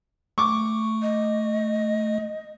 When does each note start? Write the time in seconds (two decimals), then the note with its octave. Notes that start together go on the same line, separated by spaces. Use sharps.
0.38 A3 C#6 D6
1.02 D#5